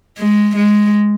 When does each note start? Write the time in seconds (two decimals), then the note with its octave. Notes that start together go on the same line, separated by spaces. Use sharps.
0.18 G#3
0.56 G#3